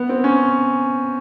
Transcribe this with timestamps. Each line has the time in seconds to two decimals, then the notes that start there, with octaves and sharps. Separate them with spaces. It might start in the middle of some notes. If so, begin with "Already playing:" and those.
Already playing: B3
0.09 C4
0.24 C#4